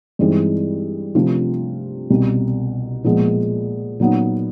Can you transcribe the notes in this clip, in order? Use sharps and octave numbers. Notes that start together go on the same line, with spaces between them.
G2 E3 G#3 C4 D#4
C3 F3 A3 D4 F4
C2 B2 G3
A#2 F3 G#3 B3
A#2 F#3 B3 D#4